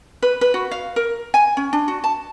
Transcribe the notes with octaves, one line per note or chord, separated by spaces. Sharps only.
B4
B4
F#4
F5
A#4
G#5
C#4
D4
F#4
A5